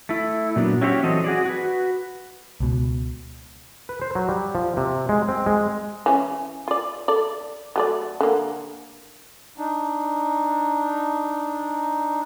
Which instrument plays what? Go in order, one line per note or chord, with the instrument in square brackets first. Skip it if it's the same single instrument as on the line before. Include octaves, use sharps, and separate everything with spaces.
[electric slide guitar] A3 E4
A#2 F#3 B3 D4
C#4 E4 F#4 G4 C5 C#5
E3 F#3 C4 A4 D#5
F#4 G#4 D5
F#4 B4
[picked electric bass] C#2 B2
[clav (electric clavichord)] B4
C5
F#3
G3
F3
C3
G#3
C4
G#3
[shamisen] E3 C#4
F4 D5
A4 D5
F#3 A3 D5
D3 A#3
[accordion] D4 D#4